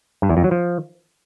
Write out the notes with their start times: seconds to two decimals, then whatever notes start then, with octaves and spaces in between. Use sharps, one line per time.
0.22 G2
0.29 E2
0.37 F2
0.44 F#3
0.51 F3